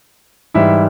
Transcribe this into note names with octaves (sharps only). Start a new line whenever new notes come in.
G#2 E3 G3 E4 E5